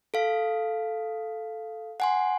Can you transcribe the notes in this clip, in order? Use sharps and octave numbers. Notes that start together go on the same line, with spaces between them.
A4 F5
F#5 G#5 C6